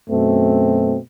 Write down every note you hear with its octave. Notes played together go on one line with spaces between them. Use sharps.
F#2 B2 A3 C4